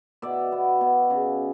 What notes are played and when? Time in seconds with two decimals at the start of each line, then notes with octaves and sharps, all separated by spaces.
0.22 B2 D5 E5
0.52 B3
0.81 B2
1.10 C#3